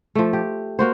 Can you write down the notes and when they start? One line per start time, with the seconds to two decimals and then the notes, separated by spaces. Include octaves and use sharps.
0.15 F3 A3
0.33 G4
0.79 A#3 F#4 C5